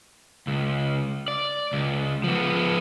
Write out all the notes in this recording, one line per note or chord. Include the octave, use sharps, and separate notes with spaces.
C#2
D5
C#2
F3 B3